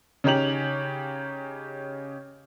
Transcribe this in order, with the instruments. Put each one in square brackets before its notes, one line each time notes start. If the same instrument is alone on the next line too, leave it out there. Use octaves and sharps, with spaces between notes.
[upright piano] C#3 C#4 D#4 G4 F7 F#7